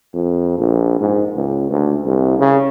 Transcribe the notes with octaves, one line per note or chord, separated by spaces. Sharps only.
F2
A#1
G#2
C#2
D2
C2
C#3